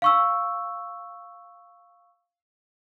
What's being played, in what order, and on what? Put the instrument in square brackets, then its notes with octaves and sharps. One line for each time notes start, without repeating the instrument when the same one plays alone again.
[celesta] F5 C#6 E6